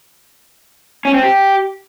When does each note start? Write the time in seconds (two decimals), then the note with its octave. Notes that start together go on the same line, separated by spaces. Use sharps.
1.05 C#4
1.14 C4
1.23 G4